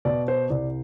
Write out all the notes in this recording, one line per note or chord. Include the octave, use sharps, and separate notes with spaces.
B2 D5
C5
C2 D5